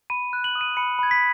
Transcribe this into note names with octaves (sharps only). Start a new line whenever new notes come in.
B5 D#7
F#6
F#7
D#6
D#7
B5 C#7
B5 G#6
B6